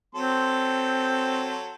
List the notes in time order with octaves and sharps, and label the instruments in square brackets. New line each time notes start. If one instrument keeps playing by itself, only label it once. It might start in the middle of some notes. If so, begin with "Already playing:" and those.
[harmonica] F#3 A4 C6 [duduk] C4